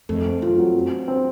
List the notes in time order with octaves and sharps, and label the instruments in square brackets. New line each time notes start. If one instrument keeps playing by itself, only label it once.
[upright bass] F2 [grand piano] A3
[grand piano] C4
[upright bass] F#2 [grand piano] F4
[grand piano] F#3
C4
C4
C4